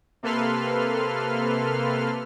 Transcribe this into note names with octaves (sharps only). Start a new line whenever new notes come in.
C3 A#3 A4 B4 C6 F6